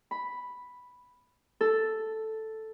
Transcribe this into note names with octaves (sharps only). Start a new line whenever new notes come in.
B5
A4